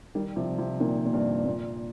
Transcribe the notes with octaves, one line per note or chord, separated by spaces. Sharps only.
D#3 G3
C3 F3
C3 F3
A#2 D#3
A#2
G2 C3
A#2